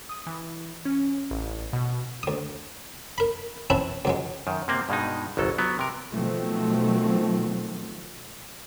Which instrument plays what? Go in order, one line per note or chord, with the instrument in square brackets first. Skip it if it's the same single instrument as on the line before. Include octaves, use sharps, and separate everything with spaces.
[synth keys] D#6
E3
C#4
A1
B2
[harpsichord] D2 D#6
A#4 B5
C4 C#4 E4 B4 A5 B5
C#2 F#3 G#3
[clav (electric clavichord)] F#2 D#3
C3 A#3 C4
G2 B2 G#3 D#4
G1 C2 F#3 A4
F#3 B3
C3 A#4
[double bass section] B2 D#3 F3 F#3 A3 C4